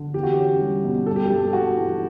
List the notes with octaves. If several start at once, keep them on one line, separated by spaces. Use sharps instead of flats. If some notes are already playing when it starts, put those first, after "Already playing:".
Already playing: D3
E2 G4
F#4
C#4 G4
G3
B2
G2 A4
G4
G2 A4
G3 F#4
E3